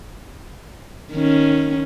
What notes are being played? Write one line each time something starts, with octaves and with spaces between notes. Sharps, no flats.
D#3 C#4